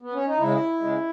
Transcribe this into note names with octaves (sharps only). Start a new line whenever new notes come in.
B3
C#4
D#4
C#3 G#3 E4
C#3 G#3